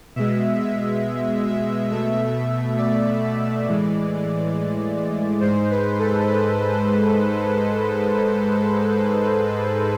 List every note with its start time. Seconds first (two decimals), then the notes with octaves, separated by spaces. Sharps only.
0.16 B2 G#3 E5
0.59 E5
1.48 E5
1.90 B2 A3 E5
2.78 D5
3.22 D5
3.66 A2 E3 G#3
5.40 G#2 G#3 C5
5.71 B4
5.99 A4
6.28 B4
6.72 C5